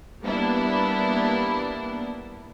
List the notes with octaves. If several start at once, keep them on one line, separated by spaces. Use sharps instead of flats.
G3 A#3 B3 D4 E4